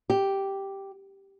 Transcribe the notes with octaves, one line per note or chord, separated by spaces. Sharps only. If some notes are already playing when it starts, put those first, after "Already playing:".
G4